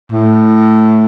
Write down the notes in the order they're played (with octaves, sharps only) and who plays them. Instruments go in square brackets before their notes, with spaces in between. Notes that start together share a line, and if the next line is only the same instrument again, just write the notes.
[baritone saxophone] A2